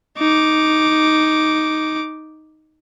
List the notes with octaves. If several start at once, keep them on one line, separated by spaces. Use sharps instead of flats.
D#4 D6